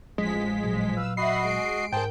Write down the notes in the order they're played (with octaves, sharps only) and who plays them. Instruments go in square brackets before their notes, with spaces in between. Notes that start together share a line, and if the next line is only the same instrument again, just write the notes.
[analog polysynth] A1 F3 B6 [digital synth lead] G#3
[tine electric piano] A#2 F#3
[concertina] B4 F5 [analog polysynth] E6
[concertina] F#4 D#5 [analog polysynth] E5 F#5 B5 [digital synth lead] C7
[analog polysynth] G#3 D7
[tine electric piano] G#2 A#4 [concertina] G#4 C5 A5 [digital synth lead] G5